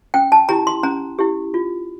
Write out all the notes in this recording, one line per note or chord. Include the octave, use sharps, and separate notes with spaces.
C#4 G5
A5
E4 G4 A#5
C6
C#4 A#5
E4 G4
F4